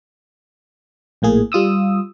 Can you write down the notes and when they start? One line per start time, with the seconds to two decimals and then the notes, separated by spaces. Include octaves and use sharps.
1.22 A#1 A2 A#3 G#4
1.52 G3 F4 D#6 E6